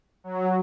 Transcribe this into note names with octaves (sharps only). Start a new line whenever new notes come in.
F#3